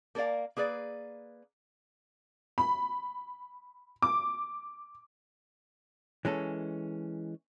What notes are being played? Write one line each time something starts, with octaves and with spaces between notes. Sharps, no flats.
A#3 A4 A#4 D5 F5
A#3 G#4 B4 D5
B5
D6
E3 G#3 C#4 A4